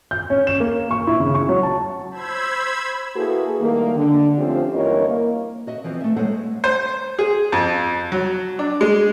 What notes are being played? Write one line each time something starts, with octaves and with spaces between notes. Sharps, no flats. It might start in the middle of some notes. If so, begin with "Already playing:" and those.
G6
C#4
E7
A#3
C#6
E4
C#3
C#6
F#3
A5
C5 B5 E6 G#6
A#3 E4 F#4 G#4 A4 B4
D#3 G3 A3 A#3
D3
F3 A3 C4 C#4 F4 G4
G2 E3 A#3 A#4 C#5 D#5
A#3
F#4 D#5 E5
E3 F3 B3 C4
A3 E5
F#3 G#3 A3 C5 F#5
C5
G#4
F2
F#3
D4
G#3